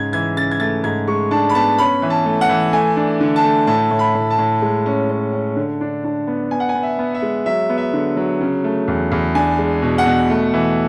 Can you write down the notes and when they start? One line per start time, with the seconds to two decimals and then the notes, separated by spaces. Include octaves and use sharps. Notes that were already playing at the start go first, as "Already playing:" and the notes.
Already playing: G#2 C#3 G#6
0.13 E3 G#6
0.37 C#3 A6
0.51 G#6
0.60 A3 A6
0.84 G#2 G#6
1.08 G#3 C#6
1.31 D4 A5
1.49 B5
1.55 B3 A5
1.78 C#4 B5
2.02 E3
2.10 A5
2.26 A3
2.41 F#5
2.49 E3
2.73 A3 G#5
2.97 D4
3.21 D3
3.36 A5
3.44 A3
3.67 A2 A5
3.91 A2
3.99 B5
4.15 A2
4.30 A5
4.38 A2
4.62 G#3
4.86 C#4
5.10 C#4
5.33 C#4
5.56 D3
5.81 D4
6.04 D4
6.27 B3
6.51 B3 G#5
6.60 F#5
6.69 G#5
6.75 B3
6.83 E5
6.99 B3
7.14 E5
7.22 G#3
7.46 F#3 E5
7.69 B3
7.78 E5
7.93 D3
8.17 F#3
8.40 C#3
8.64 A3
8.88 E2
9.12 E2
9.35 D4 G#5
9.59 G#3
9.83 B2
9.98 F#5
10.06 B2
10.30 A3
10.54 E3